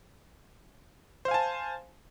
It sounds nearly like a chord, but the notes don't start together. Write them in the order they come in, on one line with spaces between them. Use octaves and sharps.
C5 F5 G#5 A5